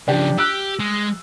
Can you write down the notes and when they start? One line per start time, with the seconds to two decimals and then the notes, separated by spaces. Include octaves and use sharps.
0.08 C#3 F3 D4 G4
0.38 G4 E6 F#6 D7
0.79 G#3